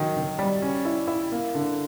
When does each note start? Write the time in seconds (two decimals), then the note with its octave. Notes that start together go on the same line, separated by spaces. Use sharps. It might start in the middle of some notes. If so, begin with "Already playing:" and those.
Already playing: D#3 F#3
0.16 D#3
0.39 G3
0.62 C#4
0.85 E4
1.08 E4
1.32 A#3
1.55 D3